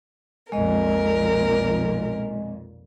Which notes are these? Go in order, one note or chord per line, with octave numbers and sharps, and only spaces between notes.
B1 F2 A#2 G#3 A#4 D#5